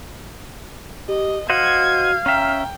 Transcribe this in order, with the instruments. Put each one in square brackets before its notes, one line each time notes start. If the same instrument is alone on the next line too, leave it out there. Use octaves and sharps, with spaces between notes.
[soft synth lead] G4 [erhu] D#5
[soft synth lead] F#4 [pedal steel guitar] C5 D#5 F#5 [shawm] F5 [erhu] G#6
[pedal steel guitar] C#4 E5 [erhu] G5 [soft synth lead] A#5